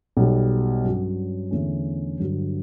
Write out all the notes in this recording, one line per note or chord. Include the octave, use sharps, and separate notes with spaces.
B1 B2 G3
G2 F#3 C#4
E2 D3 A3 C#4
G2 D3 F#3